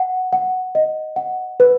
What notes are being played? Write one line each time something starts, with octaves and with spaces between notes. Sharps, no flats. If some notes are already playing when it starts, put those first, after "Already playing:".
Already playing: F#5
F#5
D#5
F#5
B4